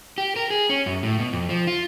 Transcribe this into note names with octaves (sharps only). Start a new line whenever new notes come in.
G4
A#4
G#4
C#4
F#2
A2
B2
F2
F3
F4